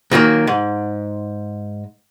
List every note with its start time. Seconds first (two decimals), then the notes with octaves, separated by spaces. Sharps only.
0.11 A#2 D#3 F#3 A#3
0.47 G#2